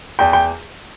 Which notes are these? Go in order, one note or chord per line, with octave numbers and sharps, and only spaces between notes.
E2 G5
G5